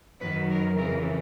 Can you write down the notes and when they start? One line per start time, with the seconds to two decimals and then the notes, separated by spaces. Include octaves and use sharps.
0.20 F#2 D#3 F#3 B4
0.49 A#4
0.77 F2 C#3 E3 A#4